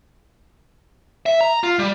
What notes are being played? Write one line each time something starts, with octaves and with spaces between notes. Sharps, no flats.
E5
A#5
F4
G3